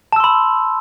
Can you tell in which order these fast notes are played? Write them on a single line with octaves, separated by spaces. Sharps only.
A5 E6 C6 B5